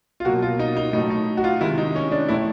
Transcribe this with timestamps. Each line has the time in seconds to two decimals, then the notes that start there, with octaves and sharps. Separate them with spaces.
0.20 F4
0.25 B2 F#3 A#3 F#4
0.42 F4
0.59 D#4
0.77 D#4
0.93 A2 F#3 A3 D#4
1.10 D#4
1.37 F#4
1.44 F4
1.61 C3 D#3 G#3 E4
1.78 D#4
1.96 C#4
2.12 D4
2.28 A2 E3 A3 E4